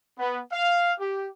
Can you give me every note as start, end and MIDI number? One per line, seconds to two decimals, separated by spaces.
0.19 0.40 59
0.52 0.92 77
0.99 1.26 67